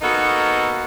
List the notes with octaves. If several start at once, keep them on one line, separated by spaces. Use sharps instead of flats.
A#3 B3 D#4 F#4 A4 A#4